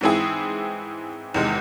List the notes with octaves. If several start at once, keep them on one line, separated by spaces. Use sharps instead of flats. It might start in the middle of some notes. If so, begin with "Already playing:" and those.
G#2 E3 C4 E4 G#4
E2 C3 D#3 G#3